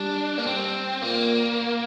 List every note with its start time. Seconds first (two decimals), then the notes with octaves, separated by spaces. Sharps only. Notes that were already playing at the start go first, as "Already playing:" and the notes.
Already playing: G3 D4
0.38 A#3
0.46 C4
1.02 A#2 A#3